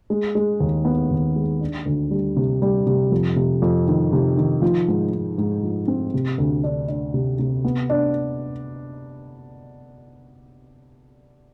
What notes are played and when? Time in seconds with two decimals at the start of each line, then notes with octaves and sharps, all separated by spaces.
0.10 G#3
0.35 G#3
0.60 D#2
0.85 B3
1.11 D#2
1.36 G#3
1.61 D4
1.86 D2
2.11 G3
2.36 C3
2.62 G3
2.87 C3
3.12 F2
3.36 C3
3.62 F2
3.88 D#3
4.13 C3
4.37 D#3
4.62 F3
4.88 G#2
5.13 G#2
5.38 G#2
5.63 F3
5.88 C4
6.14 C3
6.38 D2
6.64 D4
6.88 D4
7.14 C3
7.39 C3
7.64 B3
7.90 D4